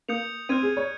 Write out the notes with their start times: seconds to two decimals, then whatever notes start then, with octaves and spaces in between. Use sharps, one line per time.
0.08 A#3 D#6 G6 C#7 F7
0.49 C4 F6 G#6 D#7
0.62 G#4
0.77 C#5